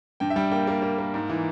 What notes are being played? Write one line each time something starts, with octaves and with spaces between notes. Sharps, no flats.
G2 G5
E5
G3 G5
A#3 G5
A#3
A#3
A#3
G#2
E3